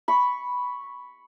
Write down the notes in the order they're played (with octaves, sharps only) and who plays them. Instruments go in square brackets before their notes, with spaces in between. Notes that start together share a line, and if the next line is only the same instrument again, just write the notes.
[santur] B5 C#6